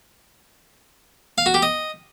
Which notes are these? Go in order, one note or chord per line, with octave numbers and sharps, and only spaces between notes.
F5
F#4
G4
D#5